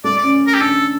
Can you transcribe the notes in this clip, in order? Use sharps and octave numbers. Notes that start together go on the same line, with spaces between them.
A3 D5
D5
C#4
A#4
G4
D4 A4